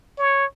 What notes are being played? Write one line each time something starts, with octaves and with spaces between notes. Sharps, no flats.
C#5